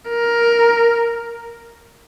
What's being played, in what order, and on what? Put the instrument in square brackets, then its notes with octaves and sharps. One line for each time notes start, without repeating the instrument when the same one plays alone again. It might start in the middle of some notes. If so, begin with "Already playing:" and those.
[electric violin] A#4